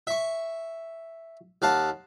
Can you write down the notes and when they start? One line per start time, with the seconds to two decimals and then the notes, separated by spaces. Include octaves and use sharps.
0.07 E5 C#6
1.62 D#2 F5 F#5 A5